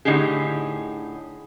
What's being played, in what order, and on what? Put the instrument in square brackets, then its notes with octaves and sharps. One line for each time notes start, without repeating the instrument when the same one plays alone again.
[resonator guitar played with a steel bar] A2 D3 D#4 G4 G#4